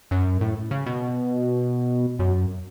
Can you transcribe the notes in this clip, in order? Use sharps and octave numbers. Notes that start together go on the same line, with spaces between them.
F#2
A2
C#3
B2
F#2